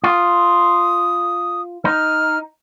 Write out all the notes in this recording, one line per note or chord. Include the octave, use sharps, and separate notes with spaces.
F4 D#6
D#4 F6